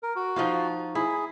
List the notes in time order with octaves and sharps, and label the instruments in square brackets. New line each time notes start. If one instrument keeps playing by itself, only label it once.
[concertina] A#4
F#4
[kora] F3 D#4 F4
[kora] E4 [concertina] G#4